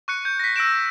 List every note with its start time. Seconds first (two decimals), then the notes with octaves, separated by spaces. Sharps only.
0.08 C#6 F#6 C#7
0.25 G6
0.40 A#6 B6
0.56 E6 A#6 D7 E7